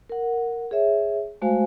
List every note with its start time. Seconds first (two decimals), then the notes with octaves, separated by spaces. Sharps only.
0.10 A#4 F#5
0.71 G#4 C#5 E5
1.42 G#3 A3 F#4 C5 F5 G#5